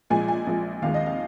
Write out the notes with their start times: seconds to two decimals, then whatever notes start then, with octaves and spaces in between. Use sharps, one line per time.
0.10 A#1 A#2 F3 G#3 G#5
0.28 G#5
0.47 A#1 A#2 F3 G#3
0.82 D#2 D#3 G#3 F5
0.94 D#5
1.06 F5